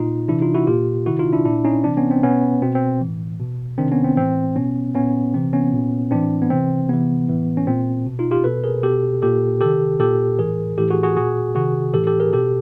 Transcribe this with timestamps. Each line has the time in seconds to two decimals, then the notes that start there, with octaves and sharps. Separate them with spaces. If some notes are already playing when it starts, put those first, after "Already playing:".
Already playing: A#2 D#4 F4
0.28 C3 E3 D4 E4
0.42 D#4 F4
0.54 E4 F#4
0.67 A#2 F4 G4
1.06 C3 D#3 E4 F#4
1.19 D#4 F4
1.33 D4 E4
1.45 A#2 D4 E4
1.65 C#4 D#4
1.84 C3 E3 C4 D4
1.97 B3 C#4
2.11 C4
2.23 B2 B3 C#4
2.62 B2 C4
2.75 C4
3.01 A2 E3
3.40 B2
3.78 C3 D#3 C4 D4
3.92 B3 C#4
4.04 C4
4.17 A2 E3 C4
4.56 B2 B3 C#4
4.95 A#2 B3 C#4
5.34 C3 E3 C4
5.53 B3 C#4
5.73 A#2
6.11 A2 E3 C4 D4
6.42 B3
6.50 C3 E3 C4
6.89 C3 E3 B3
7.28 A2 E3
7.57 C#4
7.67 A#2 C4
8.06 B2
8.19 D#4 F4
8.31 F4 G4
8.44 B2 A4 B4
8.64 G#4 A#4
8.83 B2 G4 A4
9.22 A#2 G4 A4
9.61 C3 D#3 G4 A4
10.00 A#2 G4 A4
10.39 A2 E3 G#4 A#4
10.78 A2 E3 G4 A4
10.91 F#4 G#4
11.03 F#4 G#4
11.17 A#2 F#4 G#4
11.55 C3 D#3 F#4 G#4
11.94 A2 E3 G4 A4
12.07 G4 A4
12.20 G#4 A#4
12.33 B2 G4 A4